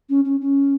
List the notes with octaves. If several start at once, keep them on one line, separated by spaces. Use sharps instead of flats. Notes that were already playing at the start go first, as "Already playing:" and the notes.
C#4
C#4
C#4